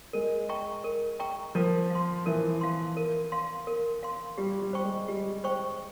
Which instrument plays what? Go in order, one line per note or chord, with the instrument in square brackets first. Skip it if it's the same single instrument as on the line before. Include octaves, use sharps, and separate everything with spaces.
[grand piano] G#3 [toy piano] A#4
[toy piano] E5 G5 A#5 C#6
A#4
E5 G5 A#5 C#6
[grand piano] F3 [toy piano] A#4
[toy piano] F5 C6
[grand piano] E3 [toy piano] A#4
[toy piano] F5 C6
A#4
F5 C6
A#4
F5 C6
[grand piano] G3 [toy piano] G4
[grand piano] G3
[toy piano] C5 G5 C#6
[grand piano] G#3
[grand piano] G3 [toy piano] G4
[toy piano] C5 G5 C#6